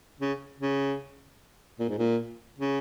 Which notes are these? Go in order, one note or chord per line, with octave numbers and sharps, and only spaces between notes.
C#3
C#3
A#2
G#2
A#2
C#3